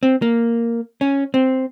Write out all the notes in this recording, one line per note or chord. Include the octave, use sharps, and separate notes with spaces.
C4
A#3
C#4
C4